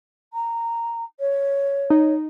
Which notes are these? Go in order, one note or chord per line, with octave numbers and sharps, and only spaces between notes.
A#5
C#5
D#4